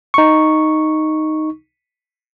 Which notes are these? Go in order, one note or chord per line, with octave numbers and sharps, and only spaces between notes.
D#4 C#6